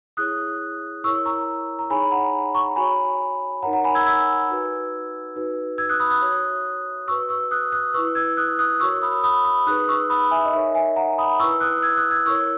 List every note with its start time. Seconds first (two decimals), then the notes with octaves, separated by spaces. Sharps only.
0.17 E4 G#4 C#5 D#6 F#6
1.04 E4 A#4 C#5 C#6 E6
1.25 A#5 C#6
1.79 A#5
1.90 D#4 G#4 C#5 G#5 B5
2.11 F#5 A#5
2.55 A#5 C#6
2.76 F#4 C#5 G#5 B5
3.63 D#4 A#4 C#5 F#5 A#5
3.73 F#5 A#5
3.84 G#5 B5
3.95 E6 G#6
4.06 E6 G#6
4.49 D#4 F#4 B4
5.36 D#4 F#4 B4
5.78 E6 G#6
5.89 D#6 F#6
6.00 B5 D#6
6.10 D#6 F#6
6.21 F#4 C#5
7.08 F#4 B4 C#6 E6
7.29 C#6 E6
7.51 D#6 F#6
7.72 D#6 F#6
7.94 E4 B4 C#6 E6
8.15 E6 G#6
8.37 D#6 F#6
8.59 D#6 F#6
8.80 F#4 A#4 C#5 C#6 E6
8.94 C#6
9.02 B5 D#6
9.23 B5 D#6
9.45 B5 D#6
9.66 D#4 G#4 B4 D#6 F#6
9.88 C#6 E6
10.10 B5 D#6
10.31 E5 G#5
10.45 D#5
10.53 D#4 A#4 C#5 E5
10.75 E5 G#5
10.96 F#5 A#5
11.18 B5 D#6
11.40 E4 B4 C#6 E6
11.60 D#6 F#6
11.82 E6 G#6
11.97 D#6 F#6
12.11 E6 G#6
12.26 E4 A#4 C#5 C#6 E6